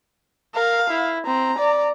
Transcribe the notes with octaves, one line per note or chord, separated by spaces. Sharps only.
A#4 F5
E4
C4 A#5
D5